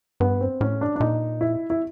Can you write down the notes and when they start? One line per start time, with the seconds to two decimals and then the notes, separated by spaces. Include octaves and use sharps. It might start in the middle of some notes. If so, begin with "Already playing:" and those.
0.20 G2 B3
0.41 C4
0.61 A2 C#4
0.81 D4
0.96 D4
1.00 A#2 D#4
1.41 E4
1.70 E4